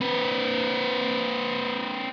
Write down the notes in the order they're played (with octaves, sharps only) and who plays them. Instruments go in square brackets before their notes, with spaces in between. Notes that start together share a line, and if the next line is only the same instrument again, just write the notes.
[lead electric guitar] C4 B4